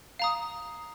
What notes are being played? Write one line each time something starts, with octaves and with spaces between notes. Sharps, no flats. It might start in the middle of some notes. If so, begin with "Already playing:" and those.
F5 A#5 D#6